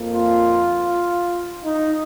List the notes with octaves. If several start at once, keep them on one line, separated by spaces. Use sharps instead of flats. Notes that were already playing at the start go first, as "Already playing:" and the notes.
Already playing: F2 F3 A#3
F4
D#4